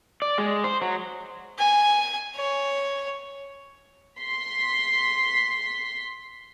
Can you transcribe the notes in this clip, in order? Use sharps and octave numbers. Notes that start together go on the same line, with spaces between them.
D5
G#3
C5
F#3
G#5
C#5
C6 B6